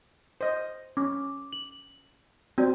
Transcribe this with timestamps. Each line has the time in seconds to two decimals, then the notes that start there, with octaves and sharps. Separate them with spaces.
0.41 C5 D#5
0.97 C#4 D6
1.53 F#7
2.58 C4 F#4 D5